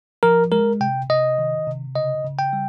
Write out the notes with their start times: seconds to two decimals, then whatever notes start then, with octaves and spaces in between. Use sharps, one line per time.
0.23 F3 A#4
0.52 G#3 A#4
0.81 C3 G5
1.09 C3 D#5
1.39 D#3
1.67 C3
1.95 C#3 D#5
2.24 C#3
2.39 G5
2.53 G3